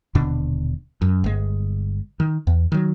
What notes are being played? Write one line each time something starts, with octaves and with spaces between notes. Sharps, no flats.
D#1 B2 D3 D4
F#2
G1 G#3
D#3
E2
D#3 F#3